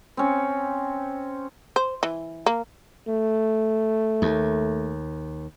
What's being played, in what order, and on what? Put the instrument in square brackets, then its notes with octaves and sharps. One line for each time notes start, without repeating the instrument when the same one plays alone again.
[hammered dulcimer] C4 C#4
[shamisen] C5
E3
A#3
[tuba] A3
[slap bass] D#2